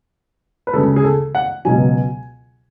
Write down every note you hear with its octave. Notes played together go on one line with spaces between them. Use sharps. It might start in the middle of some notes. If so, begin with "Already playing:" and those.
B4
D2 C#3 G#3 A4
G#4
A4
F#5
C#2 B2 F#3 G#5